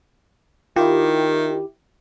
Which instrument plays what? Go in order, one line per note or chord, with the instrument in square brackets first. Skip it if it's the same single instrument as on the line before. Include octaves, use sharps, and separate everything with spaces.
[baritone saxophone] D#3 [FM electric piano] E4 G4 [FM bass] F4